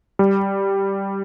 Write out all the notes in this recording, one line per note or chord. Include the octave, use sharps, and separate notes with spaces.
G3